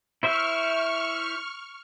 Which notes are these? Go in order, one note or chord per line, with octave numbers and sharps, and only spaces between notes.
E4 C5 E5 C#6 F6